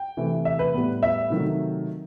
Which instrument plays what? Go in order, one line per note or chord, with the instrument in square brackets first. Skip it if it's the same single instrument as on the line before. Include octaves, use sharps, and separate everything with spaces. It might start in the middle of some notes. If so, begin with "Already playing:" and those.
Already playing: [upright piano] G5
C3 E3 A3
E5
B4
A2 G3 B3
E5
C3 D#3 F#3 A3